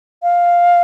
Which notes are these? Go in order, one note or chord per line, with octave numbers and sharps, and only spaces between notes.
F5